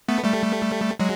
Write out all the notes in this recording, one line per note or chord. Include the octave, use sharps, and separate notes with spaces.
A3 B3
G3 A3
F#3 G#3